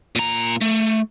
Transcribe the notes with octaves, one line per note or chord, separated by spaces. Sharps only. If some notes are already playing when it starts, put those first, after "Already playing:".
A#2 A#5
A3